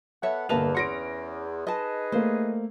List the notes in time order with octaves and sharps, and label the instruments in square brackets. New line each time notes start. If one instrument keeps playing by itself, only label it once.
[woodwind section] B3 A4 F#5 [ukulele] C#5 E5
[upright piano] G1 A#3 F7 [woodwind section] E2 [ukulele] B4 D#5 A5
[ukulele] C#4 G#4 F#5 [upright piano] C6 A#6 D7
[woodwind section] D#4 G#4 B4 [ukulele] D#5 A5
[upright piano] A3 A#3 [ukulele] C5